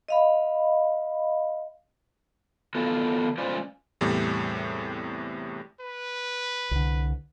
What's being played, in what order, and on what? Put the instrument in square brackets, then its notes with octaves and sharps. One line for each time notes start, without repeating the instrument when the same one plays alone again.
[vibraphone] D#5 F5 B5
[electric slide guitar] D#3 B3 F4 F#4 A4
G#3 C#4 F4 B4 C5 D5
[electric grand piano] E2 A2 C3 G3
[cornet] B4
[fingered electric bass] C2 D3